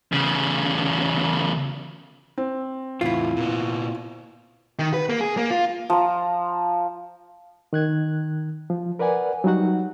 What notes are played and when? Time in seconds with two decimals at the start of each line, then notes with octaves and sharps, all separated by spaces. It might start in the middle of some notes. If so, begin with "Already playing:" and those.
0.12 E2 C#3
2.38 C4
3.01 E2 A2 E4 F4
3.37 A#2 B3
4.79 D#3
4.94 B4
5.09 A#3
5.21 G#4
5.37 A#3
5.51 F4
5.90 F3 A#5
7.73 D#3 F#6 G#6
8.70 F3
8.99 A#4 B4 D5 F#5 G#5
9.44 F#3 G3 D#4 F#4 F#5